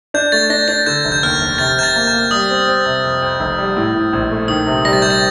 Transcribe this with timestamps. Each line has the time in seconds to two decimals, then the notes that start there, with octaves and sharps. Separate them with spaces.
0.14 D4 G6
0.32 A3 A6
0.50 D4 A#6
0.68 D4 A6
0.86 D3 G6
1.05 F1
1.12 G6
1.23 D#2 F6
1.41 F1
1.58 C3 A6
1.77 C3 G6
1.83 A6
1.96 A#3
2.07 G6
2.13 A#3
2.31 G3 D#6
2.50 C4
2.68 C4
2.85 C3
3.04 F2
3.22 F2
3.40 F1
3.58 G3
3.77 A2
3.95 A2
4.13 A#1
4.31 A3
4.48 D#3 D#6
4.67 C3
4.85 G3 A#6
4.93 A6
5.02 G3 G6
5.10 A6